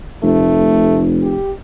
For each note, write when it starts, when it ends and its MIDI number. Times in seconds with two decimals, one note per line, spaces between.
0.23 1.39 29
0.23 1.05 57
1.23 1.52 67